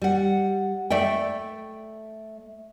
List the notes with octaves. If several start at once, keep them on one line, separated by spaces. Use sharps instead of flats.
G3 F#5
A3 D5 E5 G5